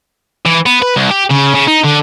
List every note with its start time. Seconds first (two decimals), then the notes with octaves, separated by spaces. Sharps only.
0.46 E3
0.66 B3
0.82 B4
0.97 C2
1.11 G4
1.31 C#3
1.55 C#3
1.67 D#4
1.84 D3